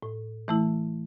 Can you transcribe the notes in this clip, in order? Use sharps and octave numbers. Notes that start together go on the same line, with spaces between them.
A2
E3 A3 E4